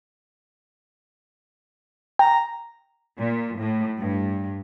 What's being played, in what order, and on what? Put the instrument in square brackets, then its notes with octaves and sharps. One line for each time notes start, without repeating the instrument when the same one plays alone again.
[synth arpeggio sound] G5 [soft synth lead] A#5
[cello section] A#2
A2
G2